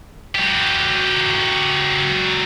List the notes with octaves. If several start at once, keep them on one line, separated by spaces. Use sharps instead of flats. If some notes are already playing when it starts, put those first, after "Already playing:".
F#3 G4